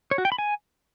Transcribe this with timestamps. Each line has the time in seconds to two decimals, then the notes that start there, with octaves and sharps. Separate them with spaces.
0.11 C#5
0.18 F#4
0.25 G5
0.32 B5
0.38 G#5